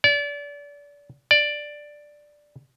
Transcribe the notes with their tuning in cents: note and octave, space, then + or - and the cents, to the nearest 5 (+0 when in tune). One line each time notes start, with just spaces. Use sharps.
D5 -30
D5 +5